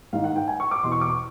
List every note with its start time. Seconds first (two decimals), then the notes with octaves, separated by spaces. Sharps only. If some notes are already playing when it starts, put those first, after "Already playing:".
0.13 G#2 D#3 F5
0.24 F#5
0.36 G5
0.48 G#5
0.60 C#6
0.71 D6
0.83 E2 B2 C6
0.92 C#6
1.01 D6
1.10 C#6